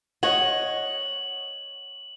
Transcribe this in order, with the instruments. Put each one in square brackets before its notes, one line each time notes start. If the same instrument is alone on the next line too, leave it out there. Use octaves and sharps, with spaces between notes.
[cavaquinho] C#5 [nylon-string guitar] D#5 F#5 [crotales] F#7